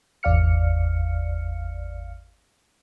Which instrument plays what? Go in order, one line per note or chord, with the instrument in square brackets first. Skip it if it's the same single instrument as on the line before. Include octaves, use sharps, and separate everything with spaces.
[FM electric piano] G#1 E2 D5 F5 F6 C#7